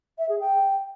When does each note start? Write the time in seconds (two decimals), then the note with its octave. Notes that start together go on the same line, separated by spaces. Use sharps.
0.18 E5
0.29 G#4
0.40 G5